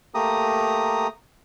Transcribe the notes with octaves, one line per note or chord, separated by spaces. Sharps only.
A3 A#3 G4 A#5 D#6